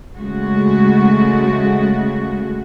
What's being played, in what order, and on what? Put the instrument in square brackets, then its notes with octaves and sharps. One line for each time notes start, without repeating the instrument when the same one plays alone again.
[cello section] C#3 G#3 A3 F#4